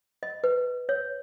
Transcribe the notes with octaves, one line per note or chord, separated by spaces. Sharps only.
D#5
B4
C#5